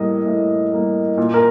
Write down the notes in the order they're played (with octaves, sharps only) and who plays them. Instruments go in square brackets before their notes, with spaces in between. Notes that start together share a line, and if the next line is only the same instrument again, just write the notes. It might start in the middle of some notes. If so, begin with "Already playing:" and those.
Already playing: [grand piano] A2 G3 A#3 D#5
A2
G3 A#3
A#2
A#4